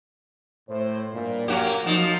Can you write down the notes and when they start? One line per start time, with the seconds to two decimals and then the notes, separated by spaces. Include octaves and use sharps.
0.69 A2 C5
1.13 G2 A#2
1.48 F#3 A#3 C#4 F#4 G4
1.86 F3 F#3 D#4